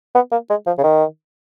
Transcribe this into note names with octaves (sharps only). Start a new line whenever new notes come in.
B3
A#3
G#3
F3
C#3
D#3